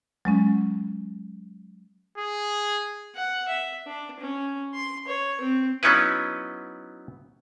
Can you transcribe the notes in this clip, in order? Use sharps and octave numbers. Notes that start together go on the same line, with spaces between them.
F#3 G#3 C#4
G#4
F#5
E5
D4
C#4
C6
C#5
C4
F#3 B3 C#4 D#4 E4 B4